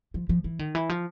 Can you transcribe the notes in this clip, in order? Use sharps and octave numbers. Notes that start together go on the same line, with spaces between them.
F3
F3
E3
D#3
E3
F3